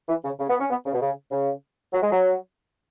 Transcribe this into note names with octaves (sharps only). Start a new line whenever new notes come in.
E3
C#3
C#3
B3
C#4
B3
C#3
B2
C#3
C#3
F#3
G#3
F#3